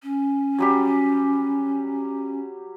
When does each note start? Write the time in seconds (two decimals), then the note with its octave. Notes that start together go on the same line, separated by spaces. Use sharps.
0.03 C#4
0.58 F#3 G3 G4